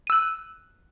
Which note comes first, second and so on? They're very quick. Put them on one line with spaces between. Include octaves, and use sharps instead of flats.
D#7 E6 F#6